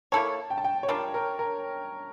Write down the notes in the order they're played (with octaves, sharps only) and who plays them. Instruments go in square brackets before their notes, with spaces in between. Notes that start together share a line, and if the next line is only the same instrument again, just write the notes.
[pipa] A#3 E4 A4 C#5 [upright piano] A5
[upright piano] G5
A5
G5
C#5
[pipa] G3 D4 F4 [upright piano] A#4
[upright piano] A#4
A#4